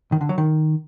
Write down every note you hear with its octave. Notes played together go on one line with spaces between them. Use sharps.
D#3
D3
F#3
D#3